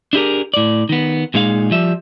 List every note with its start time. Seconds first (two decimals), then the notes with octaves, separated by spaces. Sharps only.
0.13 D4 E4 G4 G#4 A#4
0.54 A2 D5
0.89 D#3 B3
1.34 A#2 G#3 D#4 G#4 F5
1.71 F3 G3 E5